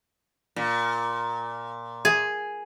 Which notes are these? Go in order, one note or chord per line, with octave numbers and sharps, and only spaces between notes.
A#2
G#4